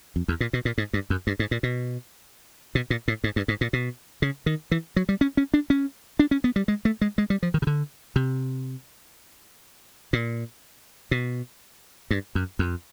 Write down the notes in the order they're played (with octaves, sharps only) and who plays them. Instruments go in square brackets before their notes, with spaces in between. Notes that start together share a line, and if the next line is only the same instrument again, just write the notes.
[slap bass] F2
E2
A#2
B2
A#2
G#2
G2
F#2
G2
G#2
A#2
B2
B2
A#2
A2
G#2
G2
G#2
A#2
B2
C#3
D#3
E3
F#3
G3
C#4
C#4
D4
C#4
D4
C#4
B3
G3
G#3
A3
G#3
G#3
G3
F3
D#3
C#3
D3
C3
A#2
B2
G2
F#2
F2